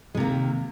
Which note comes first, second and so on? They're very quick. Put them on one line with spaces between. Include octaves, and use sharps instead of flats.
G#3 C3 A#3 D#3